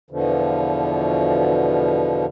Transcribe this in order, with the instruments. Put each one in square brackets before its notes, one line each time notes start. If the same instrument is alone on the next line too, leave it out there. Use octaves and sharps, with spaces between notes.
[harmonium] E2 B2 D3 F3